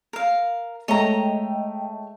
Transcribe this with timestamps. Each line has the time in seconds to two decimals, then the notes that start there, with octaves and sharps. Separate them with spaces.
0.13 A#4 F5
0.88 G#3 A3 C#5 D#5 G5 A#5